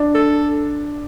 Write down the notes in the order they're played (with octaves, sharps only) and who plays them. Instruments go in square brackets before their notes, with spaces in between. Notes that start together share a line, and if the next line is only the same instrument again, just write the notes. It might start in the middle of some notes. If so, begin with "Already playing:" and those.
Already playing: [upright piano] D4
[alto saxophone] A4